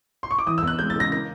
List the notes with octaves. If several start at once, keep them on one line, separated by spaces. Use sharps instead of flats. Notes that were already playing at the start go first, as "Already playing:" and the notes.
C6
C#6
D6
E3 D#6
E6
E2
F#6
G#3 G6
A6
C#3 A#6
A#3 A#6